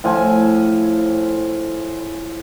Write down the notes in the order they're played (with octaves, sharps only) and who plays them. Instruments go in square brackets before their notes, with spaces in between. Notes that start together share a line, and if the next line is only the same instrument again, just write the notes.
[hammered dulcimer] A2 F3 G#5